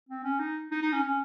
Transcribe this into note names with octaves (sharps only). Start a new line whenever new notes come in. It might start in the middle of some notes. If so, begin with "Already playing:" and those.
C4
C#4
D#4
D#4
D#4
C#4
C#4